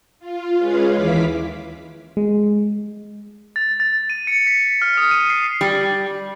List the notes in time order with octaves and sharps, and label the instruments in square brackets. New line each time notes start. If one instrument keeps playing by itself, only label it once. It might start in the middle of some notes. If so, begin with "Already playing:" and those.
[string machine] F4
G#3 C#4 G#4 B4 F5
D#2 E3 E4 F5 D6 B6
[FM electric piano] G#3
[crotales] A6
A6
D#7
C#7
B6
F6
D#6
D#7
C7
[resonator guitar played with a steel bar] G3